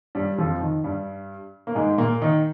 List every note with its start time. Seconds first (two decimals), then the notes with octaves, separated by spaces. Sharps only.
0.15 G2 G3
0.38 F2 F3
0.61 D#3
0.84 G2 G3
1.67 A#3
1.75 G#2 G#3
1.98 A#2 A#3
2.21 D#3 D#4